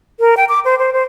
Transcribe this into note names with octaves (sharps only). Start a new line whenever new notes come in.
A#4
G5
D6
C5
C5
C5